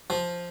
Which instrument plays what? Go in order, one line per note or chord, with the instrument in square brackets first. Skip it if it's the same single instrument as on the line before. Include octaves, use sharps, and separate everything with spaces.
[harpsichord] F3